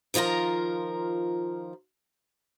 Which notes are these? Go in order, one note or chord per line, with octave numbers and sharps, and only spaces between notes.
D#3 F3 F4 A#4 A#5